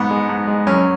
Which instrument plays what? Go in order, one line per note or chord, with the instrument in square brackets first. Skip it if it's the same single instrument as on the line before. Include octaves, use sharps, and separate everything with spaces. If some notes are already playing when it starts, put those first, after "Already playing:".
Already playing: [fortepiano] G#2 B3
G#3
G#2
G#3
F#2 C#4